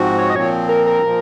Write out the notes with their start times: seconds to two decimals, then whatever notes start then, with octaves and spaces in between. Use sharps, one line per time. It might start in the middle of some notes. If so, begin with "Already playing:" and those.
Already playing: G#2 F3 C4 F#4
0.18 C#5
0.30 D#5
0.35 A#2 F3 C4 C#5
0.69 A#4
0.86 A#4
1.03 A#2 F3